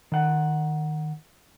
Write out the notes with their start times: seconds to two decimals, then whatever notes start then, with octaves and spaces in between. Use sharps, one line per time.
0.12 D#3 F#5